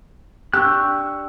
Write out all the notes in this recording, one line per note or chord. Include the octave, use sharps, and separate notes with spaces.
D4 G4 C#6 E6 F#6